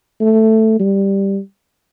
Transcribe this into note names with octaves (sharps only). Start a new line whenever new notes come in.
A3
G3